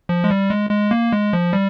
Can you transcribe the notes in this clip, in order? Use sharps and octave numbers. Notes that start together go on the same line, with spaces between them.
F3
G#3
G3
G#3
G#3
A#3
G#3
F3
G3